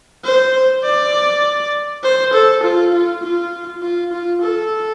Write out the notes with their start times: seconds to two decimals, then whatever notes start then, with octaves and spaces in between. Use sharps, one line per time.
0.24 C5
0.83 D5
2.03 C5
2.33 A4
2.63 F4
2.93 F4
3.23 F4
3.82 F4
4.12 F4
4.42 A4